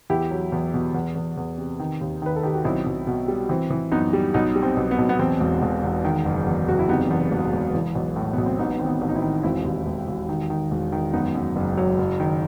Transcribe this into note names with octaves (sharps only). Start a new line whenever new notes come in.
E2 E4 G4
F#3
E2
B2
E2
E2
E2
C3
D#3
D#2
D#3 B4
A4
D#3 G4
F#4
B1 C4 E4
B1
B2
G3
E3 C4
E3
F#2 B3 D#4
G3
B1 B3 D#4
G3
C4
B1
B3
B1
B3
E2 C4
E1
E1
E2
D#3
F#1
E2
F#1 F#4
E4
C3 B3 D#4
E2
E1
E1
E3
B1
A2
B1 B3
C4
A1 B3 D#4
D#3 C4
B3 D#4
A1
D#4
C4 E4
D#3
E1 C4 E4
D#2
E1
E1
D#3
D#3
E1
D#3
F#2 B3 D#4
F#2
F#1
F#3
F#1
D#3